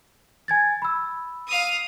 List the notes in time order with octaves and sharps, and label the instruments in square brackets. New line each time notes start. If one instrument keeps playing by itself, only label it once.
[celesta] G#5 G#6 A6
B5 E6
[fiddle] F5 D#6